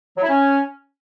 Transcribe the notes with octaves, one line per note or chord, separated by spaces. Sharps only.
F#3
E4
C#4